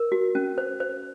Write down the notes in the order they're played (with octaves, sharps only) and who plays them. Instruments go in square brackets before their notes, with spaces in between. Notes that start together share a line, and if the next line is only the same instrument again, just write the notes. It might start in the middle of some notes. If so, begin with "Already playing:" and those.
Already playing: [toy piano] A#4
F#4
C#4
C5
C5